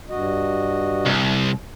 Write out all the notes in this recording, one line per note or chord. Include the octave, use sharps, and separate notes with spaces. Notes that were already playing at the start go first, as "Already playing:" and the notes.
G2 F#4 D#5
C2